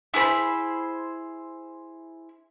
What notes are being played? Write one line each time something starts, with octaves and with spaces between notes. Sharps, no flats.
E4 G#4 C5 B5